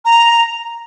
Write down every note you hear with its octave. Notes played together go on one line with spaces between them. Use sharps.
A#5